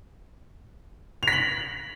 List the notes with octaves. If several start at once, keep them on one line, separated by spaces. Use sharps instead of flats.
B6 F7 F#7